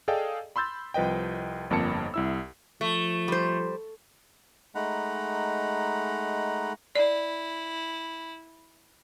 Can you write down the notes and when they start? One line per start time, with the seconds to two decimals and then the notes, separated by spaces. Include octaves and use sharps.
0.08 G#4 A4 D5 D#5 F5 G5
0.56 B5 C6 E6 G6 A6
0.94 C2 F3 B4 D#5 G5
1.70 G1 F2 A#3 A5 C#7
2.14 C2 E4 E6
2.81 F3 A3
3.28 G3 C5
4.75 G#3 A3 D#4 F#5 A#5 B5
6.96 E4 D5